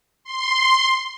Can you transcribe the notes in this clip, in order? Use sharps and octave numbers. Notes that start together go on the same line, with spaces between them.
C6